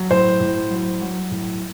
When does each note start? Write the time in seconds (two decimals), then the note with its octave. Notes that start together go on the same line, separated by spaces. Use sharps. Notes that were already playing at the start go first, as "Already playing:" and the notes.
Already playing: F#3
0.11 A2 C5
0.40 A2
0.70 F#3
1.01 F#3
1.31 A2